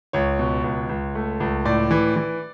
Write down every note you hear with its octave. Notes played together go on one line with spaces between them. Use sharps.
C#2 C#5
B2
C#2
C#2
A3
C#2
A2 D5
E3
E3